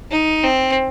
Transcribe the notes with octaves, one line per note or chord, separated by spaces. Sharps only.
D#4
C4